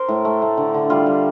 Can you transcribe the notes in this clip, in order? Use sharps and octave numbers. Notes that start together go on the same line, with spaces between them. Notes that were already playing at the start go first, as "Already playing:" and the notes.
Already playing: A#4 C5
A2
A3
A3
D3
D3
G3 F4
G3